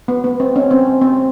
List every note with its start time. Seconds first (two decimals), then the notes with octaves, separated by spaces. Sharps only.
0.08 B3
0.24 B3
0.40 C4
0.56 C#4
0.71 C4
1.02 C4